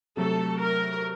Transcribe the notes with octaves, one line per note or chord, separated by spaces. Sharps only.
C3 F#3 A3 A4
A#4